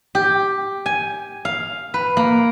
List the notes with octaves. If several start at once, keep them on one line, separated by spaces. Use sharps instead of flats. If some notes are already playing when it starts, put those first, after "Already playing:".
G4
G#5
F5
B4
A#3